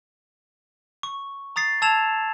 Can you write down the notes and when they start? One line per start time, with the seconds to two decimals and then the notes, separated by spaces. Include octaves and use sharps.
1.03 C#6
1.56 A#5 D#6 A6 C7
1.82 A5 E6 G#6 E7 F7